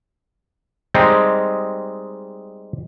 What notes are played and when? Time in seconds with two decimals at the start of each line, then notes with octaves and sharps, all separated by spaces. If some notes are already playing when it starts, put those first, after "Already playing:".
0.94 G3 G#3 C4 D#4